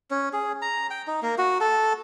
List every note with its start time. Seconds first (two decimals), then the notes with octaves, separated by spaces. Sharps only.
0.11 C#4
0.33 G#4
0.62 A#5
0.90 G5
1.07 D#4
1.23 A#3
1.38 F#4
1.61 A4